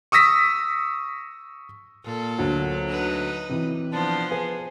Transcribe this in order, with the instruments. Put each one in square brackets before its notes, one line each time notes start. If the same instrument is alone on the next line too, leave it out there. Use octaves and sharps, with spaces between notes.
[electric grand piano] C#6 D#6 E6 A#6 B6
[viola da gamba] A#2 A4
[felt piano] D2 [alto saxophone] F#3
[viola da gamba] D#4 B4
[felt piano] C3 E3
[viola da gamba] F3 B3 C5 [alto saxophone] D4
[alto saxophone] G#4 [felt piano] B4